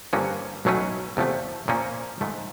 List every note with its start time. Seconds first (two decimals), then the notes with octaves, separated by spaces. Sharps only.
0.13 G2 D3 F3 A#3 C#4
0.65 B1 B2 F#3 A3 C#4
1.17 E2 C3 F3 A3
1.68 A#2 F3 A#3 C#4
2.21 G#2 F3 A3